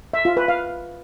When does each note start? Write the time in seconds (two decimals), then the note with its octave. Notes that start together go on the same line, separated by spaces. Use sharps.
0.13 E5
0.25 F4
0.37 B4
0.48 F5